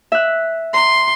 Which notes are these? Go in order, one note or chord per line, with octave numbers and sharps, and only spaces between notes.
E5 F#6
A#5 C6